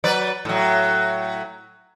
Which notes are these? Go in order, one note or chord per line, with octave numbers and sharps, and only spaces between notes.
F#3 B4 D5
A2 F#3